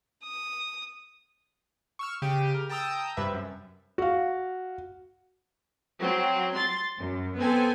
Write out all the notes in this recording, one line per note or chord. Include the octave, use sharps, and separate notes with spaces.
D#6
C#6 E6 F6
C#3 G4 D#7
A#4
G5 A5 A#5 D#6 E6 G6
G2 C3 B4 E5
F#2
F#4 F5
F#3 C4
C6 A6
F#2
B3 C4 A4 G#5